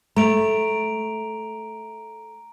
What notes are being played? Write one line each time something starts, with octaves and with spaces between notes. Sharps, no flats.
A3 A#5 D7 F7